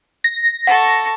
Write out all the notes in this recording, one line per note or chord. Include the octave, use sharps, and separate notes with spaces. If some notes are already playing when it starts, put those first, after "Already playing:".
A#6
A4 F#5 C#6